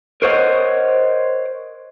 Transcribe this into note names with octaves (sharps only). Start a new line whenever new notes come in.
A#4 C5 C#5 D#5 F#5